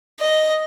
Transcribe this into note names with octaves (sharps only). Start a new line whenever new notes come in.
D#5